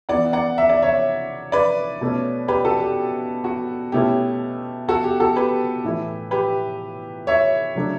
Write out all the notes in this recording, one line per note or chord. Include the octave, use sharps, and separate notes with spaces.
E3 B3 E4 D5 F#5
D5 F#5
E5
D5
C#5 E5
B4 D5
B2 A3 C#4
G4 B4
F#4 A4
G4
F#4
B2 A3 C#4 E4 G4
F#4 A4
G4
F#4 A4
G4 B4
A2 E3 A3 E4
G4 B4
C#5 E5
C#3 F#3 A3 D4